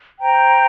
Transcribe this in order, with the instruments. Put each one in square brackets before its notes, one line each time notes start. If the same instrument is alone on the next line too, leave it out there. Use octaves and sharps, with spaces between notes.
[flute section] C5 G5 A#5